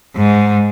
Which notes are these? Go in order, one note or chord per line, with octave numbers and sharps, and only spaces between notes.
G#2